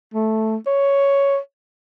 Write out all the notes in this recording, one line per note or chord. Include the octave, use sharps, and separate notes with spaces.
A3
C#5